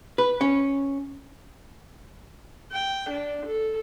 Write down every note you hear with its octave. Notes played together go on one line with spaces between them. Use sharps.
B4
C#4
G5
D4
A4